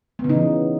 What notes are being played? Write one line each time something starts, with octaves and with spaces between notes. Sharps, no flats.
B3
C#3
D#4
E3